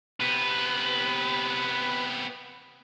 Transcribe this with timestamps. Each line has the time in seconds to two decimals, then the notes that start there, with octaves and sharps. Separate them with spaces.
0.20 C3 B3 B4